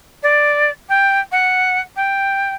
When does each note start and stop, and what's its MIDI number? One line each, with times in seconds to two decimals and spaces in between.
0.23 0.70 74
0.89 1.20 79
1.32 1.81 78
1.96 2.54 79